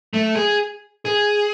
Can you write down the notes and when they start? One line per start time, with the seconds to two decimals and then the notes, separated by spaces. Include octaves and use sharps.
0.13 A3
0.36 G#4
1.05 G#4